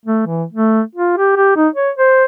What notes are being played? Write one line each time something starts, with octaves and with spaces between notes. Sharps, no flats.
A3
E3
A3
F4
G4
G4
D#4
C#5
C5